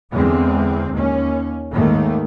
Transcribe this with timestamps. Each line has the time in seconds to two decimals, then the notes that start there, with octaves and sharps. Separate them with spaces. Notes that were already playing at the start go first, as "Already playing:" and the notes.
0.11 E2 D3 G#3 C4
0.92 D#2 C#4
1.72 D#2 G#2 D#3 A3